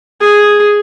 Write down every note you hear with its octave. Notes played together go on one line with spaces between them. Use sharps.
G#4